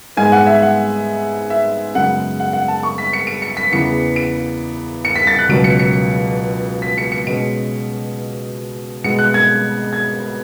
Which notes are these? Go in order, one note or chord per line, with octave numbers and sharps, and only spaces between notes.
G#2 G#3 B3 G#5
F#5
E5
F#5
E5
F#2 C#3 G#3 B3 F#5
F#5
F#5
A5
C#6
B6
C#7
D7
C#7
B6
E2 C#3 E3 B3 C#7
D7
C#7
B6
A6
F#6
C#2 B2 F#3 C#4 D7
C#7
C#7
B6
C#7
C#7
B2 G#3 C#4 D7
B2 G#3 B3 C#7
F#6
G#6
G#6